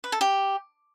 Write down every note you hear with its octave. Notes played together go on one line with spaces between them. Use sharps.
B4
A4
G4